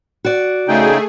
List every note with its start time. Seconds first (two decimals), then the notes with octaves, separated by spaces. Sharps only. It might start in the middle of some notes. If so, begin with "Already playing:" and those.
0.25 F#4 D5
0.68 C#3 A3 D#4 G#4 G5